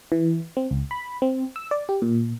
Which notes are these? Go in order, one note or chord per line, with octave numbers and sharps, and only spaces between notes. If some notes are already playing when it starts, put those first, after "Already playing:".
E3
C4
C#2
B5
C4
E6
D5
G4
A#2